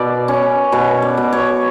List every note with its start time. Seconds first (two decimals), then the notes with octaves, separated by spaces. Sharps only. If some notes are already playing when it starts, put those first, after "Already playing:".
Already playing: B2 D5
0.28 C#4
0.72 B2 C#5
1.02 D5
1.17 B2
1.33 C#5